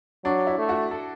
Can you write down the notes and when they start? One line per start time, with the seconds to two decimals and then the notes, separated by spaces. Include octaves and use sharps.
0.25 F#3 D4
0.47 E4
0.58 A3
0.69 F#4
0.91 A4